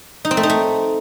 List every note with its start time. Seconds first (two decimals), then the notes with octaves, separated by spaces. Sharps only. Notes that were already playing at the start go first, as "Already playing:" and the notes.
0.25 D#4
0.31 C4
0.37 A3
0.43 D#4
0.50 A3